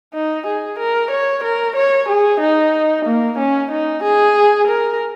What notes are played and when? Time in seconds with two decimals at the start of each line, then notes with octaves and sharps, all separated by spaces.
0.14 D#4
0.46 G#4
0.79 A#4
1.11 C#5
1.43 A#4
1.76 C#5
2.09 G#4
2.41 D#4
3.05 A#3
3.38 C#4
3.71 D#4
4.03 G#4
4.68 A#4